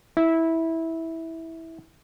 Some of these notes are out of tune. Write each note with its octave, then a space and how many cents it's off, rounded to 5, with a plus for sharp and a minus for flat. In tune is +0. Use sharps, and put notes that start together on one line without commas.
E4 -15